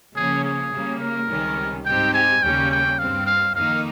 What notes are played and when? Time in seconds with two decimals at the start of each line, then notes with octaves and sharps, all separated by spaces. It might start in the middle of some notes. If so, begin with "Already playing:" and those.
0.15 C#3 F3 A#3 C#4 G#4
0.44 G#4
0.72 C#3 G3 A#3
1.00 A#4
1.29 C#2 C3 D#3 G3 C#4
1.85 G#2 G3 C4 D#4 G4 G5
2.14 G#5
2.42 D#2 C#3 G3 A#3 C#4 G5
2.71 G5
2.99 G2 G3 C4 F5
3.26 F5
3.55 F2 D#3 A#3 D#4 F5